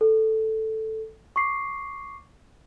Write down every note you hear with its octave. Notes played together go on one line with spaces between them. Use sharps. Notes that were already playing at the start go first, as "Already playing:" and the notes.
A4
C#6 D6 C7